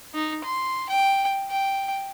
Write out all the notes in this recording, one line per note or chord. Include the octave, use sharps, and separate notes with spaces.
D#4
C6
G5
G5